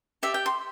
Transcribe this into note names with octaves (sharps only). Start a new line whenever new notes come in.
G4 D5 E5
G5
C6